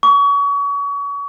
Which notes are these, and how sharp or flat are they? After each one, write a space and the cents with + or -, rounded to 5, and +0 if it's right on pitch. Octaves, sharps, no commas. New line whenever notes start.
C#6 +35